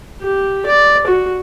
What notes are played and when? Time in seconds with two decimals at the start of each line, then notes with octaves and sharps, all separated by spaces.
0.22 G4
0.66 D5
1.07 F#4